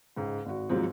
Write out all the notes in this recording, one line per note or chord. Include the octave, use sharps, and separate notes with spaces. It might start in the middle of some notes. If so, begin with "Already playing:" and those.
C#2 G#2
G#1 F#4
D#2 G#2 F3 F#3 C4